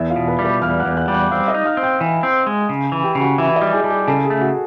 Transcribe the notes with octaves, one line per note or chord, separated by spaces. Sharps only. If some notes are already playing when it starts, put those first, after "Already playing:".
Already playing: E2 E4 E5
F4 F5
B2
B4 B5
G3
B4 B5
E2 F5 F6
F#5 F#6
E2
F#5 F#6
G3
F#5 F#6
C4 F5 F6
D#5 D#6
D#4
F5 F6
C4
G5 G6
E3
C4
G#3
C#3
E3
G4 G5
C#3
F#4 F#5
E3 E4 E5
D#5
G3
G#4 G#5
G3 A5
G#4 G#5
C#3 A4 A5
G#4 G#5
A3
F#4 F#5